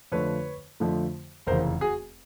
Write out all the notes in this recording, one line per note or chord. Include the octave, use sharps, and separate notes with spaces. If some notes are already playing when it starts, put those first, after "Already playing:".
F2 D3 F3 A3 B4 C#5
F2 D3 F3 A3
F1 E2 C#3 A#4 C5
F#4 G#4